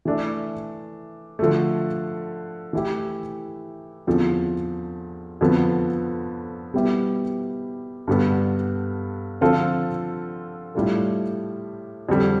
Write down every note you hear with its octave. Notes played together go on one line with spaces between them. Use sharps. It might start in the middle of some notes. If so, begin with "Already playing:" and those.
E3 A3 D4
D3 F3 A3
E3 A3 E4 G4
E2 D3 F3 C4
F2 D3 F3 B3
B2 G3 B3 E4 G4
G2 D3 G3 B3
D3 F3 C4 F4 A4
A2 G3 D4 F4 A4
F2 D3 G3